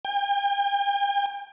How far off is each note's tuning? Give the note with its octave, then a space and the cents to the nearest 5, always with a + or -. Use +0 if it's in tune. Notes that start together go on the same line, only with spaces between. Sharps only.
G5 +40